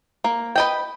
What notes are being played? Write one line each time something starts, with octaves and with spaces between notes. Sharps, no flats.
A#3
B4 D#5 G5